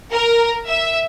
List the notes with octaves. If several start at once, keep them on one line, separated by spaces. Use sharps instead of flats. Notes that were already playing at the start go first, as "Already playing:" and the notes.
A#4
E5